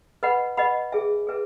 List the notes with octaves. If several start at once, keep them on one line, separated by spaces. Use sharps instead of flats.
B4 D#5 F#5 B5
B4 D#5 F#5 B5
G#4 B4 E5 G#5
G#4 B4 E5 G#5